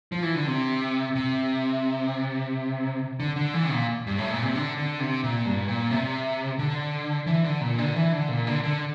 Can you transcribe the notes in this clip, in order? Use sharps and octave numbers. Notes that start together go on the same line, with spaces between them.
F3
E3
D3
C3
C3
D3
D3
E3
A#2
G2
A2
A#2
C3
D3
D3
C3
A#2
G2
A#2
C3
D3
E3
D3
A#2
D3
E3
D3
A#2
D3
D3